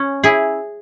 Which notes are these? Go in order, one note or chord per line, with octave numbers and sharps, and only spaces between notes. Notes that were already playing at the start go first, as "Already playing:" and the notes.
Already playing: C#4
E4 G#4